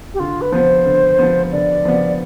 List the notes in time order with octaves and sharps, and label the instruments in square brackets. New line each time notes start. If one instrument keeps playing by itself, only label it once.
[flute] G4
[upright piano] D3 [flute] F4
[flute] B4
[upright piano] F3 B3 [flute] C5
[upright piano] D3
F3 B3
[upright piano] D3 [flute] D5
[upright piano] F3 B3